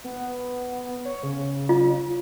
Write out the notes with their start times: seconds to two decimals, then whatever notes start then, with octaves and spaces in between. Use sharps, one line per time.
0.04 B3
1.05 C#5
1.23 C#3
1.69 F4